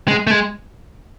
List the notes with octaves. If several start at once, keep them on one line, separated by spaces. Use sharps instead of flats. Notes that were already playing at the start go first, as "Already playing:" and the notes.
G#3
A3
G#3